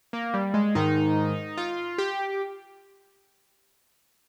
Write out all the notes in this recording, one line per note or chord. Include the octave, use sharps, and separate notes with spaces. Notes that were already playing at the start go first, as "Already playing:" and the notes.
A#3
G3
G#3
G#2 D#3 D#4
F4
G4